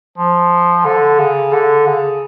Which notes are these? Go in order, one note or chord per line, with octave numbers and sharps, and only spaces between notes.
F3
D3
C#3
D3
C#3